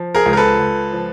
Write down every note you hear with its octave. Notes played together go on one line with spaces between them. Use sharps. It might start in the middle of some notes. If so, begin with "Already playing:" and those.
Already playing: F3
G#4 A#4
C#2
A#4
A4 B4
C#2
F3